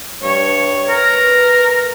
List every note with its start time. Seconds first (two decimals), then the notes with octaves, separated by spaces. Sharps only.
0.22 G2 C#5
0.89 A#4 B4